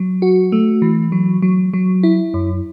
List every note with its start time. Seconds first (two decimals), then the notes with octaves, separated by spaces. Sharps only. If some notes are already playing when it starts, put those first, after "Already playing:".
Already playing: F#3
0.22 F#4
0.52 A3
0.82 E3
1.12 F#3
1.42 F#3
1.73 F#3
2.03 E4
2.34 F#2